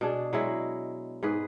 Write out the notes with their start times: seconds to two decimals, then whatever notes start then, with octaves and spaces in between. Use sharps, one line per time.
0.01 B2 D4 G#4
0.33 F#3 G#3 E4
1.23 G#2 G#4 B4